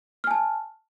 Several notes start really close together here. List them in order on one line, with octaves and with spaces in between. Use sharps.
F6 G#5 A5